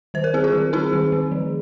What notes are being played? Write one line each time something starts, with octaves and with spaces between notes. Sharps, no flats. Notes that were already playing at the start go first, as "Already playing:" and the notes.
D#3 C5
A#4
C4 G#4
F4 A#4
D#3
C4 D#4 G#4
D#3
D#3
F3